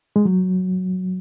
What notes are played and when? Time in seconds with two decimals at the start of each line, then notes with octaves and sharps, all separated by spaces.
0.16 G#3
0.25 F#3